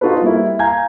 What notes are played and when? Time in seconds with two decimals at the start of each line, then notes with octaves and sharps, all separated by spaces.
0.01 D#4 F4 F#4 A4 B4
0.22 G3 A#3 E4
0.59 F5 G#5 A#5 G6 G#6